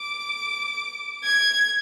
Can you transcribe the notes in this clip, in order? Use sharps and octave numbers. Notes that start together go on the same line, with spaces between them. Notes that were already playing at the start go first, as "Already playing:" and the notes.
Already playing: D6
G#6